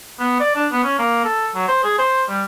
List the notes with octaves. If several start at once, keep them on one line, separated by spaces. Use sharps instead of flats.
B3
D5
D4
B3
C#4
A#3
A4
F#3
C5
G#4
C5
G3